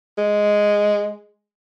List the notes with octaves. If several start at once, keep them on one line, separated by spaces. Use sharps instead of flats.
G#3